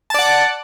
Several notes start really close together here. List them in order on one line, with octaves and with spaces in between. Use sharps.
A5 D5 F#5